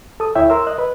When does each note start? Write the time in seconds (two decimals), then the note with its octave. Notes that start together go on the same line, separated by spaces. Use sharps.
0.20 A4 D#6
0.35 D2 E4 C#5 E5 G5
0.50 A#4 C6 E6
0.67 D#5 F#6
0.78 B4